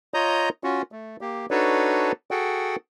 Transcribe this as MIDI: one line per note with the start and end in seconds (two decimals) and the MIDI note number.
0.14 0.49 65
0.14 0.49 73
0.14 0.49 75
0.14 0.49 82
0.14 0.49 87
0.14 0.49 91
0.64 0.82 61
0.64 0.82 65
0.64 0.82 66
0.92 1.17 57
1.21 1.46 58
1.21 1.46 67
1.51 2.12 62
1.51 2.12 63
1.51 2.12 66
1.51 2.12 69
1.51 2.12 71
1.51 2.12 73
2.31 2.76 66
2.31 2.76 68
2.31 2.76 69
2.31 2.76 78
2.31 2.76 79